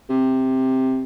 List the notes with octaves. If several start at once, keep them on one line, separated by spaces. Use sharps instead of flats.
C3